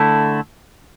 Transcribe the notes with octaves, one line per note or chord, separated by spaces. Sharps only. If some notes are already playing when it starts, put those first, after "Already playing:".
Already playing: D3 A3 E4